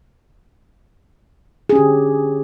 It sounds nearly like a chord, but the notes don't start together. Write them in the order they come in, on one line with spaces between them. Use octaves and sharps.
G#4 C#4 G4 D3